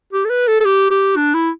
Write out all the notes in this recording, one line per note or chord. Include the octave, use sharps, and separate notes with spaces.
G4
A4
B4
A4
A4
G4
G4
D4
E4